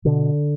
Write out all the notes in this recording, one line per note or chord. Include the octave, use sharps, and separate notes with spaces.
B2 D3